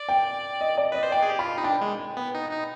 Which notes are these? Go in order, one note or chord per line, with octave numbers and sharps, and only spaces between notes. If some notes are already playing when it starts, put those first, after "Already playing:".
Already playing: D5
G5
D#5
D5
B4 D#5
C5
D5 G5
G#4
G4
F4 B5
D#4
D4 G5
G#3
B3
D#4
D#4